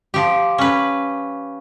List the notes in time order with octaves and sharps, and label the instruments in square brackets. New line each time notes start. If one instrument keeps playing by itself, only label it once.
[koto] F3 G4
C#4 B4